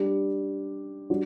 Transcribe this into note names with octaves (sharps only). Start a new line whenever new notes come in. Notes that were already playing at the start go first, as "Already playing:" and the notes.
Already playing: G3 D4 G4
G3 D4 F#4